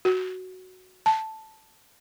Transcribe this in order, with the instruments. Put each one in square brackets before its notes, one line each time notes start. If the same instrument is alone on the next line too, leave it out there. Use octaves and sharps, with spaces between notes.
[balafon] F#4
A5